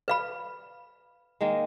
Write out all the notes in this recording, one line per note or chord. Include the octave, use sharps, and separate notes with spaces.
B4 F5 B5
D#3 G#3 A#3